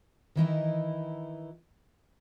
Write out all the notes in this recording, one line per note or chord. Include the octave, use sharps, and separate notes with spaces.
D#3 E3 D#4 E4